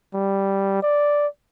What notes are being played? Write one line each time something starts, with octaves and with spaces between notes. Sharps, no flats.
G3
D5